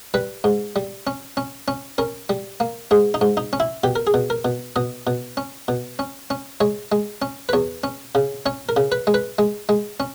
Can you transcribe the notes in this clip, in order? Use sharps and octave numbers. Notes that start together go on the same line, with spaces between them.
G3 B4
G#2
G3
C#4
C#4
C#4
C#4 A#4
G3
A#3
G#2 G#4
D#4
G#2
D#4
C#4
E4
B2 G4
A#4
G#4
B2
A#4
B2
B2 D#5
B2
C#4
B2
C#4
C#4
G#3 C#5
G#3
C#4
B4
E2 C#5
C#4
C#3
C#4 C#5
A#4
C#3
B4
G#3
B4
G#3
G#3
C#4